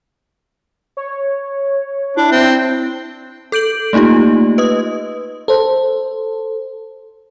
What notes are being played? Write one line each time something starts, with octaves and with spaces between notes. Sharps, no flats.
C#5
D4 E4
C4
A4 G6 D7 F#7
A3 A#3 D#4 F4 G4
B4 D#5 D#6
A4 C5